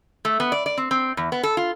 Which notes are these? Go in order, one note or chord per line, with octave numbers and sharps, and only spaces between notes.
A3
B3
D5
D5
C4
C4
E2
B3
A4
F4